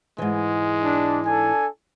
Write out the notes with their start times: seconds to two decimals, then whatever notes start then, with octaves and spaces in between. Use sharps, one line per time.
0.18 G#2 E3 G#3
0.83 D4
1.25 D4 A4 G#5